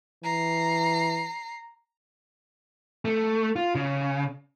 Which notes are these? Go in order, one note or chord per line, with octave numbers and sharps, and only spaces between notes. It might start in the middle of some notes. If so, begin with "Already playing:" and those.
E3 A#5 C7
A3
F4
C#3